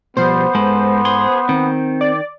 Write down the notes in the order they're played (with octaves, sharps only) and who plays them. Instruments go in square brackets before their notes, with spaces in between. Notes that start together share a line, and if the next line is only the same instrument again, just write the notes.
[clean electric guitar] B2 F3 G3 [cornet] B3 [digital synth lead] C5
[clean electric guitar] G#2 A4 B4 [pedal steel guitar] G#3
[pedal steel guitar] G#4 C6
[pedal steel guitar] D#3 [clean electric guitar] C4
[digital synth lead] D5